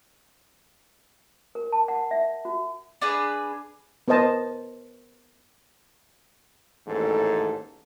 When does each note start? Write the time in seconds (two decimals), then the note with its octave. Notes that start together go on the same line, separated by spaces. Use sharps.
1.55 A#4
1.72 A5
1.88 F#5
2.11 E5
2.45 F#4
3.01 D4 G#4 B4
4.08 B3 A#4 C5 D#5 A5
6.87 A1 D#2 G#2 A4